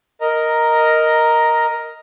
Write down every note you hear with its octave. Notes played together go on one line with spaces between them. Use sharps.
A#4 D#5 A#5